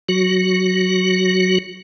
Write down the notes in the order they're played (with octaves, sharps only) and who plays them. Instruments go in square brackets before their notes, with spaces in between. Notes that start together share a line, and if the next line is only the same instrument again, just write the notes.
[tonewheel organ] F#3 F#4